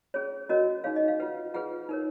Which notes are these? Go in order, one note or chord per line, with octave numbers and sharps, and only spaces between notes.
C#4 G#4 C#5
C#4 F#4 A#4 C#5 D#5
D#4 G#4 C#5 F5
D#5
F5
F4 B4 F#5
F4 G#4 B4 F#5
D#4 A#4 C#5